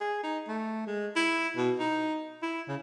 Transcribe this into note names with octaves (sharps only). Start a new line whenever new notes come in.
G#4
D#4
A3
G#3
E4
B2
D#4
E4
C#3